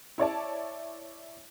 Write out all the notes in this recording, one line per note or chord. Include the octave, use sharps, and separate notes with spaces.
E4 C#5 D5 A5